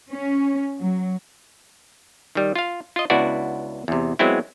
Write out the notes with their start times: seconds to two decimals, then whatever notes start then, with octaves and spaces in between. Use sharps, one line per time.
0.10 C#4
0.79 F#3
2.35 D#3 G3
2.56 F4 F5
2.96 F4 D#5
3.10 C#2 B3 D4 E4 F#4 D5
3.88 E2 C3
4.19 F#3 G#3 B3 C4 E4